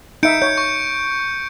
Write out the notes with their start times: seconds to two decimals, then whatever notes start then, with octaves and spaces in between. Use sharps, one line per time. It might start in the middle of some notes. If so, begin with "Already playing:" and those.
0.23 D#4 E5 G6 C#7 D7
0.42 C#5 G6
0.58 C#6